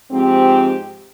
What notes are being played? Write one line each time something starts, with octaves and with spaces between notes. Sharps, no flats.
G#2 F3 C4 G4